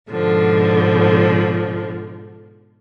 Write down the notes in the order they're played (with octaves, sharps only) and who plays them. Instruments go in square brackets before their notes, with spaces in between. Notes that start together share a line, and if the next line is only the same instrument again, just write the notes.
[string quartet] G#2 B2 D3 F3